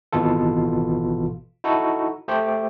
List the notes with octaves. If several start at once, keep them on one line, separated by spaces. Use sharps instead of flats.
G#1 B2 E3 F4 A4
D#4 E4 F#4 A4
A3 G4 C5